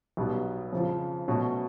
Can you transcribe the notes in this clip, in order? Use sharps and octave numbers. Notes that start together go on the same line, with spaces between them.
B1 B2 G3 B3
F2 C#3 F3
B2 F#3 A3 C#4 F#4